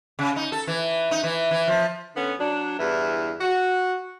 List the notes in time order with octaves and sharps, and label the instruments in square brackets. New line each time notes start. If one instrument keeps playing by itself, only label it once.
[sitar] C#3
D#4
A4
E3
D#4
E3
E3
F3
[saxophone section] D3 B3 C#4
F#3 D4
E2 G2 E3
F#4